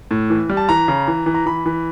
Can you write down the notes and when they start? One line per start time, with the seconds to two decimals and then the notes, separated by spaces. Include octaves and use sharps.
0.11 A2
0.30 E3
0.50 G3
0.57 A5
0.69 E3 A#5
0.88 C#3
1.08 E3
1.26 E3
1.34 A#5
1.46 E3 B5
1.66 E3